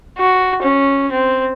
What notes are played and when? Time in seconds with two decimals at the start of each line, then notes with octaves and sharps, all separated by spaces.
0.18 F#4
0.62 C#4
1.12 C4